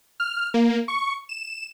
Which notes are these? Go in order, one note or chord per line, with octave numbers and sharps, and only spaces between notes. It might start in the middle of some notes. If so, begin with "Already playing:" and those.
F6
A#3
C#6
E7